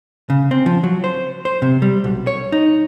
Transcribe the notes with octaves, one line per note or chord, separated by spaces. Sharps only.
C#3
C4
F3
F#3
C5
C5
C3
G3
B1
C#5
D#4